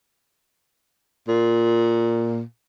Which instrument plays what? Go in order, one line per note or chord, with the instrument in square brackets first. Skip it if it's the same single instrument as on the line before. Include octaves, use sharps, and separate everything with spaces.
[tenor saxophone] A#2